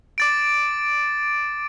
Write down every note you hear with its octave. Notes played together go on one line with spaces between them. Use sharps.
D6 A6 D7